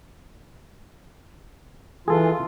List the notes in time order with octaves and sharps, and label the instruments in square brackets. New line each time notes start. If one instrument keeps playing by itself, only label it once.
[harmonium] E3 F4 [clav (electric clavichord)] G#4 A4